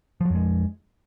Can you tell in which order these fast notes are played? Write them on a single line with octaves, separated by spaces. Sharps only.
F3 F#3 F2 G#3